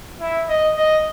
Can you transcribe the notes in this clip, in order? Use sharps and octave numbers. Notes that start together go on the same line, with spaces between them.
E4
D#5
D#5